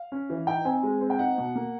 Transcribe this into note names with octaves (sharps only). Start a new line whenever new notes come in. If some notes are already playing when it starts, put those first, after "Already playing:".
Already playing: F5
C#4
E3
D#4 G5
C4 G#5
G#3
C4
G5
D#4 F#5
B2
A#3